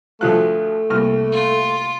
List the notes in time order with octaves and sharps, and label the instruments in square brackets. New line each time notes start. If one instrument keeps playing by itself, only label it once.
[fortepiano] D2 F3 F#6 [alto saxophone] A3 [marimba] F4 F#4 F5
[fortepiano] C2 F6 [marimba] C3 G3 A#3
[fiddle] F4